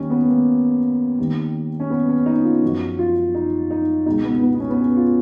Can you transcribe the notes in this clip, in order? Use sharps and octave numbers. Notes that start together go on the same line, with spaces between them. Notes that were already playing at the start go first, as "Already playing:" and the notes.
Already playing: D#2 D#3 C#4
B3
A#3
D#2 D#3
C#4
B3
C#4
D#4
F4
F#2 F3 F#4
F4
D#4
D#4
C#2 B2 D#4
B3
B3
B3
C#4
B3
C#4
F4